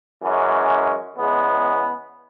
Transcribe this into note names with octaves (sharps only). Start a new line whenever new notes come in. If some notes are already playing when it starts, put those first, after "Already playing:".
F#2 E3 G#3 C#4
E2 C#3 G#3 B3